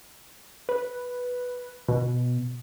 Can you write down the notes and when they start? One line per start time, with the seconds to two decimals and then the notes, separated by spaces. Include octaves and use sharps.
0.69 B4
1.88 B2